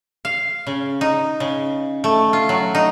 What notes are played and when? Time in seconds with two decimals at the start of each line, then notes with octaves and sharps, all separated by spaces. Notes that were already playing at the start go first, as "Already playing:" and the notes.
0.25 F5
0.67 C#3
1.01 D#4
1.40 C#3
2.04 A3
2.33 F4
2.49 F#3
2.75 D#4